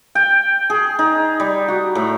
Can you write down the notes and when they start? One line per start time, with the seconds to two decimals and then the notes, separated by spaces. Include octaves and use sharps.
0.15 G5
0.70 G#4
0.99 D#4
1.40 G3
1.68 F#4
1.95 A2